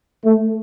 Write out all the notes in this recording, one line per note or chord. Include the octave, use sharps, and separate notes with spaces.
A3